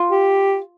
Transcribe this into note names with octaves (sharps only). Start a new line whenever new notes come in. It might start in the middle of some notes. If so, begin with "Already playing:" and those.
Already playing: F4
G4